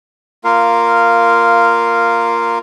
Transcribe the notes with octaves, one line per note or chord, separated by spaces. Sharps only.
A#3 F4 A#4 F5